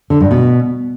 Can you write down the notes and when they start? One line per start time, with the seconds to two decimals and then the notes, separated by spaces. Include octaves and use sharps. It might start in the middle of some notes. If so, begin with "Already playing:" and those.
0.10 D3
0.20 G2
0.31 B2